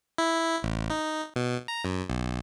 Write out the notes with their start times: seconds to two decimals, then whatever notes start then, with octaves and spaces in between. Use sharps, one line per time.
0.18 E4
0.63 A1
0.90 D#4
1.36 B2
1.68 A#5
1.85 F#2
2.10 B1